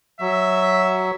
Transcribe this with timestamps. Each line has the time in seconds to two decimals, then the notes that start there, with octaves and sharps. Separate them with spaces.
0.21 F#3 E5